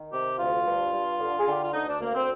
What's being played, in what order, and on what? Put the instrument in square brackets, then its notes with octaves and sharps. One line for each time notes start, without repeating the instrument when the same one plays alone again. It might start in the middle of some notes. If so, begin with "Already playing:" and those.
Already playing: [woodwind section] D#3
C3 G4
D2 F4
G2
G2
D3
G#4
D3 G4
F4
D2 D#4
D4
D2 A#3
C4